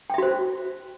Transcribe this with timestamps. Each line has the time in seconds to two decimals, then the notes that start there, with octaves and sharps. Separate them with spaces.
0.10 G5
0.14 E5
0.18 F#4
0.23 C5